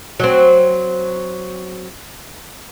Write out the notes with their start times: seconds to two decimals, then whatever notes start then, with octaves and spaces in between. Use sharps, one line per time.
0.20 F#3 C4